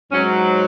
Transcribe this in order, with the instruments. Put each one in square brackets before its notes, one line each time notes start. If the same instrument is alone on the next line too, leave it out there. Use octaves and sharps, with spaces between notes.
[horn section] G#2 F#3 C#4